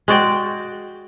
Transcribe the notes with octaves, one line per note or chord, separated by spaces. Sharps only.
G#3 F#4 D5 G5